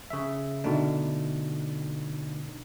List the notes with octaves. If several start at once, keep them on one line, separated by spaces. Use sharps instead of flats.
C#3 E5
B2 D3 A3 D4 D#4